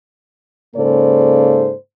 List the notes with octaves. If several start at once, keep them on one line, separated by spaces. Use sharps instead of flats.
G#2 C#3 A#3 A4 C5 D5